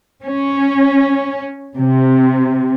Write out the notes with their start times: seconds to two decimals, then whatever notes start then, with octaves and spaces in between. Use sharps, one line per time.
0.23 C#4
1.76 C3